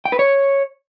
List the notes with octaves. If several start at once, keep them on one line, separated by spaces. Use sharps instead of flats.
G5
B4
C#5